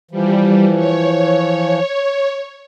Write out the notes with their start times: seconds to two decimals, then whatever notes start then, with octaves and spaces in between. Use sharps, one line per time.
0.11 E3 F3 G3
0.75 C#5